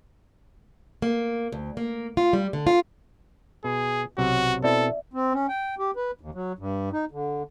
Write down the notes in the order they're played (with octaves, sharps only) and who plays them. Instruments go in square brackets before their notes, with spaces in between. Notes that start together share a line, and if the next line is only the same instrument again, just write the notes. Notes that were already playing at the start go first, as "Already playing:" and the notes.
[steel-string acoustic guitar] A#3
D2
A#3
F4
G3
D3
F4
[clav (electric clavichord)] B2 [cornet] G#4
[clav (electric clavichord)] B1 C3 F#3 [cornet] F#4
[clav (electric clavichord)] B2 C4 E4 [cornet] A4 [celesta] D5 E5
[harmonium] C4
C#4
G5
G4
B4
D#2
F#3
G2
D#4
D3